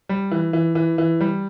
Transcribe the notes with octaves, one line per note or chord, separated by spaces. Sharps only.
G3
E3
E3
E3
E3
G3